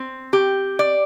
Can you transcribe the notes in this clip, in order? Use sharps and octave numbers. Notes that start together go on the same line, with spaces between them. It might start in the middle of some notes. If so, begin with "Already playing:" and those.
Already playing: C4
G4
D5